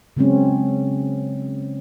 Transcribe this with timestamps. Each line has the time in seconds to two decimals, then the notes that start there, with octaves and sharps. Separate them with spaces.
0.17 C#3 F#3 G#3 C4 C#4